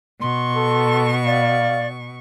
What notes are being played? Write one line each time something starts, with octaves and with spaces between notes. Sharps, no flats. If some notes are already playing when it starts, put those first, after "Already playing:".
B2 C6 C#6
A4
D5 F5